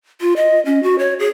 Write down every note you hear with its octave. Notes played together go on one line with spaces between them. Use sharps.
F4
D#5
C#4
F#4
C#5
G#4